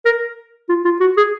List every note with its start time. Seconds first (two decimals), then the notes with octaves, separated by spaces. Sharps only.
0.05 A#4
0.69 F4
0.85 F4
1.01 F#4
1.17 G#4